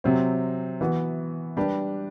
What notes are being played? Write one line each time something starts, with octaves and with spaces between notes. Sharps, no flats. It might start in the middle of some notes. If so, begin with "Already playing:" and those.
C3 F#3 C4
E3 B3 F#4
G3 D4 G4 B4